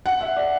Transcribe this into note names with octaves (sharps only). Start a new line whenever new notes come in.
F#5
E5
D5